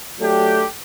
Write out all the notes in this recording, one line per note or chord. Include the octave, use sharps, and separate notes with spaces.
F#3 A3 D4 G4